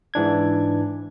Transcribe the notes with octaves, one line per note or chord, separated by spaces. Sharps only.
G#2 E3 D4 G#6